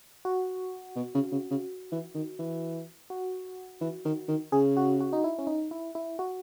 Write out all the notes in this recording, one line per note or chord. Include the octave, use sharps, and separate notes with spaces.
F#4
B2
C#3
C#3
C#3
E3
D#3
E3
F#4
E3
D#3
D#3
C#3 G#4
F#4
F#4
D#4
E4
C#4
D#4
E4
E4
F#4